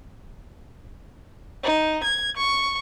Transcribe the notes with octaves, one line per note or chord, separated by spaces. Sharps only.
D#4
G#6
C#6